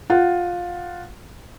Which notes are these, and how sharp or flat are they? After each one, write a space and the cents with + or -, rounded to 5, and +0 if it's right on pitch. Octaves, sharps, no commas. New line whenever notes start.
F4 +15 F#5 +15